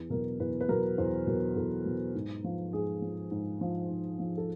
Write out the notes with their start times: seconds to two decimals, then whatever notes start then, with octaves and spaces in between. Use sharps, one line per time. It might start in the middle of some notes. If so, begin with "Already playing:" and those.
Already playing: E2
0.10 B2 F#3 A#4
0.39 E2 B4
0.60 B4
0.68 B2 F#3 A#4
0.98 E2 C5
1.26 B2 F#3 A#4
1.56 E2 A4
1.85 B2 F#3
2.14 G#2
2.44 F3
2.73 G#2 G#4
3.02 F3
3.31 G#2
3.61 F3
3.90 G#2
4.19 F3
4.37 A4